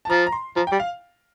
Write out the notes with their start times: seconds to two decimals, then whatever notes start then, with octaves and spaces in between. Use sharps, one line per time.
0.05 A5
0.09 F3 A#5
0.27 A#5
0.32 C6
0.56 F3 A#5
0.67 G5
0.71 G3
0.80 F5